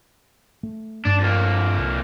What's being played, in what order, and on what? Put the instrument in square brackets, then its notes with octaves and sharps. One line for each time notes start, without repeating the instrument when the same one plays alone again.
[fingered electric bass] A3
[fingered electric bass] F1 G2 A3 [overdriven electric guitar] D4
[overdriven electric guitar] F2 A#3
[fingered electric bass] C2